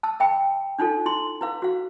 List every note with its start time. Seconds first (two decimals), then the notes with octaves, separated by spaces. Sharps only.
0.03 A5 E6
0.20 E5 G5 B5
0.79 D4 D#4 F4 A4
1.06 E4 C6
1.41 E4 B4 F5
1.62 F#4 F5